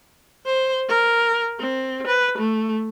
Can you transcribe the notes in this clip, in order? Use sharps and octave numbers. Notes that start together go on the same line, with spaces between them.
C5
A#4
C4
B4
A3